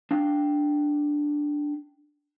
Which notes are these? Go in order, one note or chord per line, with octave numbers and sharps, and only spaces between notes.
D4 F5 G5